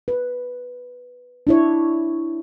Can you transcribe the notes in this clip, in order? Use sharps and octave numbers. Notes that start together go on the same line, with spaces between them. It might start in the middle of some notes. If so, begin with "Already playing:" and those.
B4
D4 E4 C#5